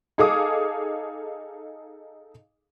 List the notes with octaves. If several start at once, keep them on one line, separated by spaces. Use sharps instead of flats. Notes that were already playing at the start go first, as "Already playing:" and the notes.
D#4 G#4 A4 F5 D6 D#6